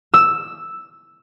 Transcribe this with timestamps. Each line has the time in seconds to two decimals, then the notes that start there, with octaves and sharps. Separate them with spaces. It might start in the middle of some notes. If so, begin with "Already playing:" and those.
0.14 E6